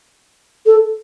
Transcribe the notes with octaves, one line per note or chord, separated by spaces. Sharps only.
A4